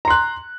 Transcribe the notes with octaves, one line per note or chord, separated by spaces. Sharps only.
A#5 C6 F#6